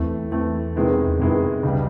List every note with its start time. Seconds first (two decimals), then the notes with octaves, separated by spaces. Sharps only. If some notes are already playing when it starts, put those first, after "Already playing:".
Already playing: E2 E3 A3 C4
0.31 E3 A3 C4
0.76 C3 D#3 G#3 B3 E4
1.19 F2 C3 D#3 G#3 B3 E4
1.63 C#2 B2 G3